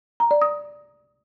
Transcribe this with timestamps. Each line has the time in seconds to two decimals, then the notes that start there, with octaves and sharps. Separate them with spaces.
0.20 A#5
0.31 D5
0.42 D#6